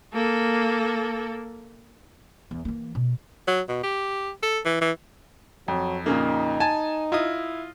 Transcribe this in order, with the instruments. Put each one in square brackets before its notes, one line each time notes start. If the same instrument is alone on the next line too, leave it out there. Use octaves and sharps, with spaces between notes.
[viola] A#3 A4
[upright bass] E2
E3 A#3
B2
[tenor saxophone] F#3
B2
G4
A4
E3
E3
[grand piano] F2 [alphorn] F#3
[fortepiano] A#2 C#3 A#3 [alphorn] D#4
[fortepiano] G#5 [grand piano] A5
[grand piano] E4 [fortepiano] F4 D#5 D#6